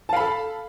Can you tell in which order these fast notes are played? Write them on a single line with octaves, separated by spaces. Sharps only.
A5 F5 B5 A4